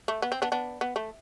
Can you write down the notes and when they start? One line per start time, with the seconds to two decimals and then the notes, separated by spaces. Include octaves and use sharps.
0.08 A3
0.22 B3
0.32 C4
0.42 B3 D4
0.52 B3 D4
0.81 B3
0.96 A3